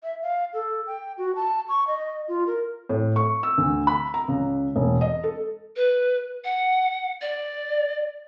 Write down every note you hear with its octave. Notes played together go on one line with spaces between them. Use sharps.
E5
F5
A4
G5
F#4
A5
C#6
D#5
F4
A#4
A2
C#6
E6
D2
B5
A#5
C#2
E1
D#5
A4
B4
F#5
D5